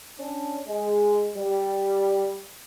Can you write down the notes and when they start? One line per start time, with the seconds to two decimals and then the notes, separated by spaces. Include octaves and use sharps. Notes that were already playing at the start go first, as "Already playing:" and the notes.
0.19 C#4 D4
0.67 G#3
1.36 G3